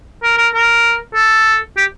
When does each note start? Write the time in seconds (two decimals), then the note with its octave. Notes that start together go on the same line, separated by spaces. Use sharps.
0.23 A#4
0.38 A#4
0.54 A#4
1.15 A4
1.77 G4